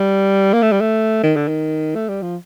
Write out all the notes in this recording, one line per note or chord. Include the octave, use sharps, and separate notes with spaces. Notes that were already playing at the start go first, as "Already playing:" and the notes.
Already playing: G3
A#3
A3
G3
A3
D#3
D3
D#3
A3
G3
F3